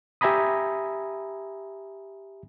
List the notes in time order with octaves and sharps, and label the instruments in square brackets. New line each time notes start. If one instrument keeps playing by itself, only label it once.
[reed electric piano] G4 E5 G#5 A#5 B5 D#6